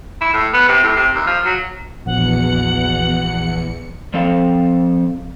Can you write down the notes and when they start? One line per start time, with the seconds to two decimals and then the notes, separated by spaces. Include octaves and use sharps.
0.21 E4
0.33 A2
0.53 B3
0.69 C3
0.83 A2
0.96 C3
1.15 D#2
1.27 F3
1.45 F#3
2.06 A#1 E2 B2 F#5 C#7
4.14 F3 C4 A4 F5